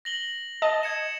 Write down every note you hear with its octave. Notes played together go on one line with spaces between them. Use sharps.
A#6 F#7 G7
D#5 A5
G#6 C#7 E7